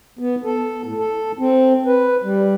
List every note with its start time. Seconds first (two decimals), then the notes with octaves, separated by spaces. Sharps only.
0.19 B3
0.44 A4
0.83 A2
0.98 A4
1.39 C4
1.86 B4
2.24 G3